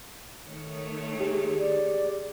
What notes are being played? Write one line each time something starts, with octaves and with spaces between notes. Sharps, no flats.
D#3 A3 C#5
G4 G#4
D5